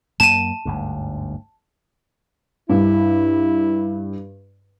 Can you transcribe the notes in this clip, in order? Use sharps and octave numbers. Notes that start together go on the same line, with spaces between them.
F#2 A#3 A5 D#7
G1 D2 G#2
G2 E4